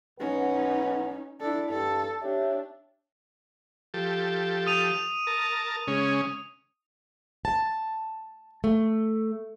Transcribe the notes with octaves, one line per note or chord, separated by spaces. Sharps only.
B1 C#4 D#4 B4 F#5
D4 E4 A4
G2 A4
D4 G4 C#5 E5
F3 G4 A4
D#6 D#7 F7
A#4 A5
C#3 G#3 C#4
A5
A3